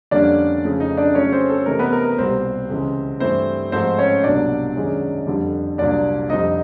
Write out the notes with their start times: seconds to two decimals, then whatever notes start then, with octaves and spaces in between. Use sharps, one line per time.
0.11 F2 D3 G3 A#3 C#4 D4 D5
0.64 F2 C#3 F3 A3
0.80 D#4 D#5
0.97 D4 D5
1.15 C#3 F#3 A3 C#4 C#5
1.32 C4 C5
1.49 A4
1.66 C3 E3 A3 C4 D#4 A#4
1.79 B3 B4
1.92 A#4
2.05 A#4
2.18 C2 B2 G3 A#3 C4 C5
2.69 C#2 C#3 E3
3.20 G2 E3 A3 C4 E4 C5
3.72 G#2 F3 A3 C4 C5
3.99 C#4 C#5
4.24 C2 B2 F#3 A#3 D4 D5
4.76 F#2 D#3 G#3 C#4
5.27 F2 D3 G3
5.78 C2 A#2 F#3 D4 D5
6.30 F2 D3 G3 C4 D#4 D#5